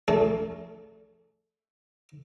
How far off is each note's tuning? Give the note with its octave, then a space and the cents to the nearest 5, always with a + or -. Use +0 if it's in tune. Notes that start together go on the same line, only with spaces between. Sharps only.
A3 +0 D4 -40 G#4 +20